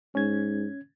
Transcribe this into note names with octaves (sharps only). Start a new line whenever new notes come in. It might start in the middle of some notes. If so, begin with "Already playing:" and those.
G#2 C#4 G#6